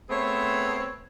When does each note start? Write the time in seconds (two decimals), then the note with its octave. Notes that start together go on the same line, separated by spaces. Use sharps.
0.10 A3 B3 C4 G#4 C5 C#5